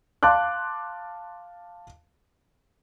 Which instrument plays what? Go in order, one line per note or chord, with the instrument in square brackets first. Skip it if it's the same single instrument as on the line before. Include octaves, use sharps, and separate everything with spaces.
[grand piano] F5 A5 C6 D6 F#6